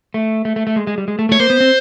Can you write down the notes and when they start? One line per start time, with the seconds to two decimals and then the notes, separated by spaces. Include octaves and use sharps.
0.14 A3
0.45 A3
0.56 A3
0.67 A3
0.76 G#3
0.87 G#3
0.98 G3
1.08 G#3
1.19 A3
1.29 A3 C#5
1.40 A#3 C5
1.50 B3
1.60 C4